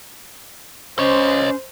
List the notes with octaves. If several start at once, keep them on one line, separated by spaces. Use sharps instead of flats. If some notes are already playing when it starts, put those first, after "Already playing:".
C#4 C5 C#5 D#5